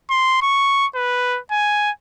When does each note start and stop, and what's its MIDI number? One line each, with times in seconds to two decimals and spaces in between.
0.10 0.42 84
0.42 0.86 85
0.95 1.39 71
1.52 1.91 80